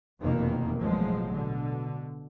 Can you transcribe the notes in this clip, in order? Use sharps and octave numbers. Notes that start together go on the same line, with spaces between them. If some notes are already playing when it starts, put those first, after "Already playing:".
F1 E2 B2 D#3 A#3
A1 B2 F3 F#3 G#3
B2 D3